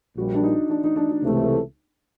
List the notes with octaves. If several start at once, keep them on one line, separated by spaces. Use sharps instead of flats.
A#1 A#2 G3 F#4
D4
D#4
D4
D#4
D4
D#4
C#2 C3 E3 A3